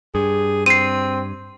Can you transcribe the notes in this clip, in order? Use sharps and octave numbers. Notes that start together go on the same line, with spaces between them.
G2 G#4
C4 C7 D#7